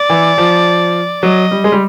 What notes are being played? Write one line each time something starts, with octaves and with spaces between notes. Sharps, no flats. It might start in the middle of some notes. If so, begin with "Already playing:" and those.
Already playing: D5
E3
F3
F#3 D#5
G3
G#3
G3